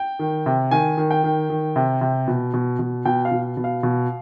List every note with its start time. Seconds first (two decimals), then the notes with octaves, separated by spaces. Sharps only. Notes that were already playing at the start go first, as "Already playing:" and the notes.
Already playing: G5
0.19 D#3
0.46 C3
0.71 D#3 G#5
0.97 D#3
1.11 G5
1.24 D#3
1.50 D#3
1.76 C3
2.01 C3
2.28 B2
2.54 B2
2.79 B2
3.05 B2 G5
3.25 F5
3.31 B2
3.57 B2
3.64 F5
3.83 B2